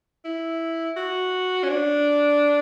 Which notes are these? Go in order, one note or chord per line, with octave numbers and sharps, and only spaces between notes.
E4
F#4
C#4
D4